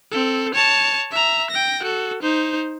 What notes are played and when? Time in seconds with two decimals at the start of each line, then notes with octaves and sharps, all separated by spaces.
0.12 C4 A4
0.54 C#5 A5
1.11 E5 A#5
1.51 G5 A#6
1.83 F#4 A4
2.23 D#4 C5